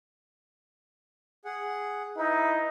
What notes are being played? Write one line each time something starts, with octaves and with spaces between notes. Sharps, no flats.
G#4 F#5
D#4 E4 B4